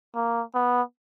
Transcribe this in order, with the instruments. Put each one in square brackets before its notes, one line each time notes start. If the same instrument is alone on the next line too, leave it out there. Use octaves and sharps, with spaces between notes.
[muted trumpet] A#3
B3